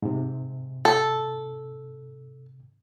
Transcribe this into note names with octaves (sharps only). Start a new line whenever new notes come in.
G#2 C3
A4